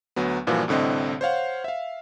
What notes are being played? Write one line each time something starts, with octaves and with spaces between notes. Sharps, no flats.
D2 F#3 B3
G2 A#2 E3 F3 A#3 F#4
C2 A2 D3 C4 D#5
C5 C#5 F5 F#5
E5 F5